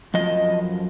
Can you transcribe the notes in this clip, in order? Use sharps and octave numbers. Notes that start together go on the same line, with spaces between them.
F#2 F3 D#5